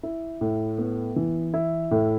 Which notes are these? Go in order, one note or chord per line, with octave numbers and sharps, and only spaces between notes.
E4
A2
B3
E3
E4
A2